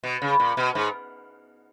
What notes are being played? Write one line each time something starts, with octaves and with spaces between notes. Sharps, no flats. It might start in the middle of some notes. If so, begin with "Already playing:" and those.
B2
C#3
A#2
B2
G#2